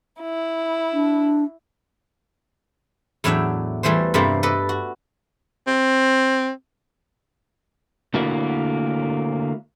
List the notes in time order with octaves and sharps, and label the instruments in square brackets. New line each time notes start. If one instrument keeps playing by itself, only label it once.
[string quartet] E4
[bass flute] D4
[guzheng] E2 A2 F#3 D4 E5 G5
E3 G3 A3 G#4 C5
G2 C3 A3 A#3 C4
A4 B4 D5 D#5
F#4
[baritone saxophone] C4
[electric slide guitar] D3 A3 A#3 E4 F#4 A#4